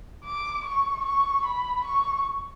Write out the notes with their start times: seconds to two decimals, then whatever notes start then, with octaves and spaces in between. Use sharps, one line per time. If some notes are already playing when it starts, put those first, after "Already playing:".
0.25 D6
0.65 C#6
1.06 C#6
1.46 B5
1.85 C#6